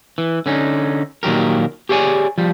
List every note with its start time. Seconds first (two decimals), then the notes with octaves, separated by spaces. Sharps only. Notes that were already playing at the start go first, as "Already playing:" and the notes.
0.18 E3
0.46 D3 C#4 D#4
1.23 A#2 D#3 F#3 G4 A#4
1.89 G4 G#4 C#5 D5 G#5
2.38 F3 G3